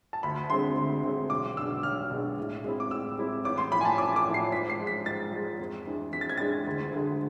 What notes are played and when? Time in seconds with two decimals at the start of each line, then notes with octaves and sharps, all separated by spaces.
0.13 A5
0.23 D2 B5
0.50 D3 G#3 C4 C6
0.77 D2
1.03 D3 G#3 C4
1.30 B1 D6
1.57 B2 G#3 D4 E6
1.83 B1 F6
2.11 B2 G#3 D4
2.38 A2
2.64 G#3 C4 E4
2.80 D6
2.91 A2 E6
3.18 G#3 C4 E4
3.45 A1 D6
3.58 C6
3.72 A2 F3 B5
3.81 G#5
3.85 A5
3.98 A1 D6
4.16 D6
4.25 A2 F3
4.34 C7
4.52 G#2 B6
4.70 C7
4.79 F3 G#3
4.87 B6
5.06 G#2 A6
5.32 F3 G#3
5.59 F2
5.86 E3 G#3 D4
6.13 F2 B6
6.21 A6
6.29 G#6
6.37 E3 G#3 D4 A6
6.67 D2
6.93 D3 G#3